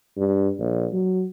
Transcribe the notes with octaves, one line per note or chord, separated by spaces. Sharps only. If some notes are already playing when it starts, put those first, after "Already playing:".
G2
A#1
F#3